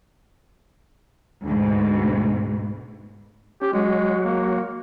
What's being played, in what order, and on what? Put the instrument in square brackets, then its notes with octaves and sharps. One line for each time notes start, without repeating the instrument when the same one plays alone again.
[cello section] D2 G#2 B2
[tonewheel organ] C#4 [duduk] G4
[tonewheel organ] F#3 F#4 [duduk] G#3
[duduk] A#3